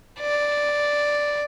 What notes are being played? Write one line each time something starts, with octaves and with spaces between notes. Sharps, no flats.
D5